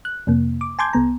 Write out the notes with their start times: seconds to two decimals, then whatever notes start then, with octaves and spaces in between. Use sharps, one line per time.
0.05 F#6
0.27 F2 C3 A#3
0.61 D6
0.79 G#5 A5 C6 D6 G6 G#6
0.93 C2 B3 A#5